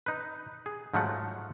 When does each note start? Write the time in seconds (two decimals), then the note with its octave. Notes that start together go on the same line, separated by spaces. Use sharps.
0.06 D#4 B4
0.66 G#4
0.94 G#2 F3 F#3 A3 F#5